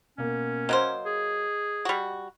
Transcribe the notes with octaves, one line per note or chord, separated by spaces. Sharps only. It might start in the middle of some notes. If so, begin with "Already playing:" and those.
B2 A#3 C#4
F#3 A#3 C5 D#5
G#4
G3 F#4